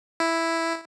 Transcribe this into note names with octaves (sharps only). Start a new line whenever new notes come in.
E4